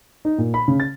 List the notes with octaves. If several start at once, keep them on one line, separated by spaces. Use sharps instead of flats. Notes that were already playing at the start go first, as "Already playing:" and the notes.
D#4
A#2
B5
C#3
A6